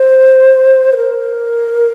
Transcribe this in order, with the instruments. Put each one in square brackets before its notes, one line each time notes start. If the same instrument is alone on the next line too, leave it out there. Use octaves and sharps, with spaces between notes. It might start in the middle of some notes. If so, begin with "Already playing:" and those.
Already playing: [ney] C5
B4
A#4